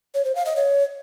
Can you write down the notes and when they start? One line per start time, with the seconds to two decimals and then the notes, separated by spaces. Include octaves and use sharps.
0.15 C#5
0.25 C5
0.35 F5
0.46 D#5
0.56 C#5